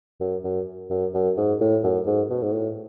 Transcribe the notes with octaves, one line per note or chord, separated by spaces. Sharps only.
F#2
F#2
F#2
F#2
G#2
A2
F#2
G#2
B2
G#2
A2